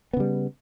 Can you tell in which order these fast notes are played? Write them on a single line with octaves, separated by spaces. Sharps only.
B3 C#3 G3